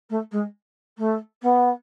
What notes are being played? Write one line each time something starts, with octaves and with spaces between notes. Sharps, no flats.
A3
G#3
A3
B3